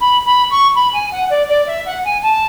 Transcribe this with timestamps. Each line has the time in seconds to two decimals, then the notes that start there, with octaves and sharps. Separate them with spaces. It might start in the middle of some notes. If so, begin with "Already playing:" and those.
0.01 B5
0.25 B5
0.51 C#6
0.75 B5
0.93 G#5
1.12 F#5
1.30 D5
1.49 D5
1.67 E5
1.86 F#5
2.05 G#5
2.23 A5